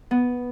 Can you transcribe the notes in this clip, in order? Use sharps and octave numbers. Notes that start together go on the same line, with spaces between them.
B3